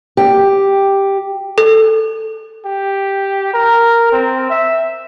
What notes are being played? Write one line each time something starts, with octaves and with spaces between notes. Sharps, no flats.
G4
A4
G4
A#4
C4
E5